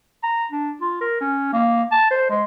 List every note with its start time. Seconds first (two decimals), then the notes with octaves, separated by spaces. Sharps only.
0.23 A#5
0.52 D4
0.81 F4
1.01 A#4
1.21 C#4
1.53 A#3
1.92 A5
2.11 C5
2.30 G#3